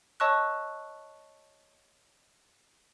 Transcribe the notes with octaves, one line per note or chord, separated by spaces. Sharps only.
C#5 D#5 A5 C#6 E6 F#6